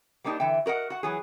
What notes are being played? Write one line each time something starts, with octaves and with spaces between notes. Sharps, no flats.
G3 A#3 D4 D#4 G4
D3 E3 E5 G5
F#4 A#4 D#5 F#5
F#4 F#5
E3 F#3 G#4